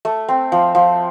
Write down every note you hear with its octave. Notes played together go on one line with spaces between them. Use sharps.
A3
C4
F3
F3